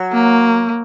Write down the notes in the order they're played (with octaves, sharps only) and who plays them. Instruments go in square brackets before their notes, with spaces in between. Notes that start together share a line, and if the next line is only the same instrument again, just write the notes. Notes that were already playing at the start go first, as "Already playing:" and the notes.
Already playing: [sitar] F#3
[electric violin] A#3